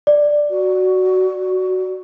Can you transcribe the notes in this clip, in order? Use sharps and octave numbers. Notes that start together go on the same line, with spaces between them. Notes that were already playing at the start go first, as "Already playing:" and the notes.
D5
F#4